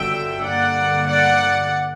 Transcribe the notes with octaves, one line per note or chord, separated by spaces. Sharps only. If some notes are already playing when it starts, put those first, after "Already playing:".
Already playing: G1 G2 D3 F#3 E5 G5
G2 D3 A#3 D5 F#5
D5 F#5